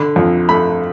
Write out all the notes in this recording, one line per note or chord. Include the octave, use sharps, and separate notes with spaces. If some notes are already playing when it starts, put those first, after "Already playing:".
Already playing: D3 B5
F2
A3 B5